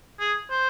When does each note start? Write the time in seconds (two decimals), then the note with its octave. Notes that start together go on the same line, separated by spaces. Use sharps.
0.19 G#4
0.50 C5